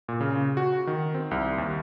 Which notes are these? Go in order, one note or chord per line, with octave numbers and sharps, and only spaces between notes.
A#2
C#3
F#4
D#3
C4
C2
D#2